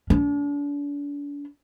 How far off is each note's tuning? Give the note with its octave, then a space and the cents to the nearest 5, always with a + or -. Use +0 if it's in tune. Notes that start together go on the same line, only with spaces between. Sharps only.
D4 -40